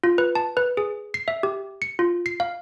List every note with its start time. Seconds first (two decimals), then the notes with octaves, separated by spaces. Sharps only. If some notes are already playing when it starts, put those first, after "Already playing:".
0.04 F4
0.18 B4
0.35 A5
0.57 B4
0.77 G#4
1.14 C7
1.28 E5
1.43 G4
1.82 C#7
1.99 F4
2.26 C7
2.40 F5